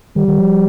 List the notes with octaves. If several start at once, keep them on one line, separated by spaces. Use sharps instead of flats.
D#3 G3
D#3
F3